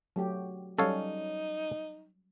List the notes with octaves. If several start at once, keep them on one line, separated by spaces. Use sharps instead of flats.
F#3 A3 G4
F#3 G3 C#4 D#4 A4 C#5 F5